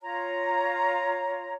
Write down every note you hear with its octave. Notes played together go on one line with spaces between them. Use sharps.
F4 C#5 A#5